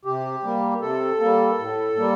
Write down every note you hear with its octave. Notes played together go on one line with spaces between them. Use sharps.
C3 G4
G3 A#3
C3 A4
G3 A#3
A2
G3 A#3